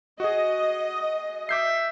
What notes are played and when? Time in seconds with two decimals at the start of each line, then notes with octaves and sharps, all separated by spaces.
0.20 F#4 G#4 D#5
1.49 E5 D6 G6 C7